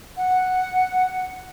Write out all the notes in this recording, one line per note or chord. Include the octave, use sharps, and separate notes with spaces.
F#5